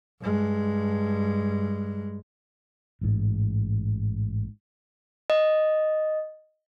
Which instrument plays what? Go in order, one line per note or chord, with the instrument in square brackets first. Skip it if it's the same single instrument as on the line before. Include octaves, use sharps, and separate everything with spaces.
[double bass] G2 G#3
[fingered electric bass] A1 G#2
[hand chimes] D#5